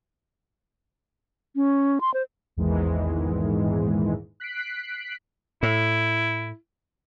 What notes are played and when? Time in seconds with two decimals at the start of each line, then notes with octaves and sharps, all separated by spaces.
1.56 C#4
2.01 C6
2.14 C5
2.57 A#1 E2 G#2 D#3 E3 G#3
4.40 F#6 B6 C7 D7
5.63 A2 E4